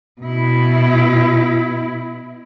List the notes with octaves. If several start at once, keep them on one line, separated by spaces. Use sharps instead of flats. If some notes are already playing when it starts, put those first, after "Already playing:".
B2 E4